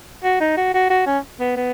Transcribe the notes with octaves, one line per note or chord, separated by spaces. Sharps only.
F#4
D#4
F#4
F#4
F#4
C#4
B3
B3